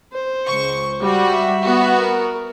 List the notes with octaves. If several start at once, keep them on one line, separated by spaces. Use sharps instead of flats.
C5
C#2 C#6
G3 F#4
E5
B3 F#4
A#4